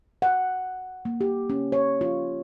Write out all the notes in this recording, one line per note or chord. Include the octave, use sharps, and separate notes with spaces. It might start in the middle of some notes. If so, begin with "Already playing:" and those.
F#5
A#3
G4
C#4
C#5
F4